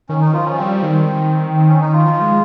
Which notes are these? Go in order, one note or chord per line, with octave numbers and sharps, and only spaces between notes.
D#3 C#4
D#4
F3 F4
C#4
G3 C4
D#3
C4
C#4
D#4
F4
F3
G#3